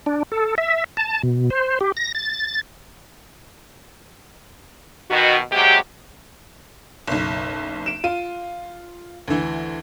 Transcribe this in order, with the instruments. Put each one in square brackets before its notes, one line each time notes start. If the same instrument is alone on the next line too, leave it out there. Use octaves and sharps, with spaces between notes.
[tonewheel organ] D4
A4
E5
A5
B2
C5
G4
A#6
A6
[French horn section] B2 D#3 F#4
C3 F#3 G#3 G4
[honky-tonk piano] F#1 B1
D7 E7
F4 D#7
D2 E3